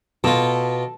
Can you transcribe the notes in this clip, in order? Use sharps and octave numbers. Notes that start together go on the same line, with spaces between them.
B2 F4 A4